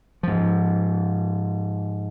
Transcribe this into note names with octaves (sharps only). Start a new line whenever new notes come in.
G#2 F3